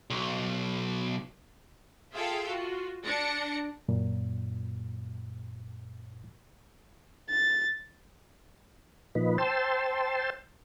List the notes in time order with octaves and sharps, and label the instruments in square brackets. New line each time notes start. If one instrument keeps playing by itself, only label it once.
[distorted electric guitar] B1
[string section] F4 G#4 A4 E5 F5 G5
F4 F#4
D4 A#6 C#7
[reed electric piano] F#2 A#2
[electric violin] A6
[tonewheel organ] A#2 F3 D#4 B4
C5 G5 A5 C6 E6